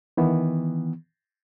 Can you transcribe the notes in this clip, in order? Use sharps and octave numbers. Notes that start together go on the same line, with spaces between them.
D#3 E3 B3